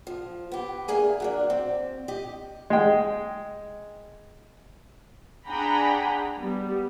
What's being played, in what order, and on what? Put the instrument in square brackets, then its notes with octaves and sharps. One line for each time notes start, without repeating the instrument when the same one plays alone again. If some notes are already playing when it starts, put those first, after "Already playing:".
[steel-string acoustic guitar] F3
B3 G4
D2 A#3 G#4 G#5
F#3 A#3 D4
C4
G4 D#5
[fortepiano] G#3 G5
[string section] D4 G#4 F#5 G5 A#5 B5
G3 B3